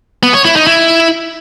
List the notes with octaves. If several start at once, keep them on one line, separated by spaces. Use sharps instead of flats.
B3
C#5
E4
D#4
E4